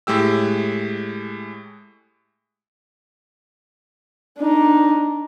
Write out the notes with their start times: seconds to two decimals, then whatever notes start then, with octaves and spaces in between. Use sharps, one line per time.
0.07 A2 G#3 G4 E6
4.39 D4 D#4